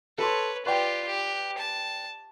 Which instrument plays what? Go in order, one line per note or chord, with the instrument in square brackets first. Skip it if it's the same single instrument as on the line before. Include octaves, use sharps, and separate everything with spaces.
[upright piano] A4 A5 C6 [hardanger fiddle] B4 C#5
[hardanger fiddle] F4 G4 [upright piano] B4 D5 G5
[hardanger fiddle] G4
A5